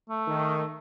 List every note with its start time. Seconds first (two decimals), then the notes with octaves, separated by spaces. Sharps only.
0.09 A3
0.28 D#3
0.58 A3